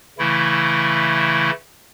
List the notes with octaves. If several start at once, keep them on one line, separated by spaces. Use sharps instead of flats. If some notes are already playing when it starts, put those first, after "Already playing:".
C#3 E3 A3 E4